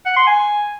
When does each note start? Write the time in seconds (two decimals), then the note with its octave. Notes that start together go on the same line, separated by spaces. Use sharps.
0.06 F#5
0.16 C6
0.27 G#5